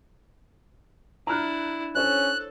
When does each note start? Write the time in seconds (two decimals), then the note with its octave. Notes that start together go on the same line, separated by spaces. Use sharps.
1.27 D4 E4 A#5 F6 F#6
1.95 C#4 D4 A4 C5 C#5 F#6